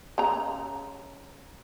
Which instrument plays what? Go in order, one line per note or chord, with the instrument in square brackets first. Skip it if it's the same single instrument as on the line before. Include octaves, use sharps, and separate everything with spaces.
[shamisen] C#3 A#5